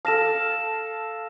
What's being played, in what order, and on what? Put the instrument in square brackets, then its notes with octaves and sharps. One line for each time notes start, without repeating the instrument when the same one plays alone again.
[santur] A4 F5 [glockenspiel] A5 A#6 E7